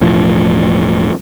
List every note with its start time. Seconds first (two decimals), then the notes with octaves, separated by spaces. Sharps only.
0.01 E1 A2 F3